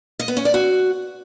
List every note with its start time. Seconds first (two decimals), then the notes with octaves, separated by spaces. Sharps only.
0.19 D#5
0.28 B3
0.37 C#4
0.45 D5
0.54 F#4